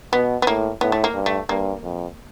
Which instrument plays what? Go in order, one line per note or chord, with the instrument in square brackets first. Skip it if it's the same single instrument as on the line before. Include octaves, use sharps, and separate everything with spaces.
[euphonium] B2 [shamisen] B3
[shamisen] B3
[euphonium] A2 [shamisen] A#3
[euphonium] A2 [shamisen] B3
[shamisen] A3
A#3
[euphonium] G2
[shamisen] A3
[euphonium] G2 [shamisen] A#3
[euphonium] F2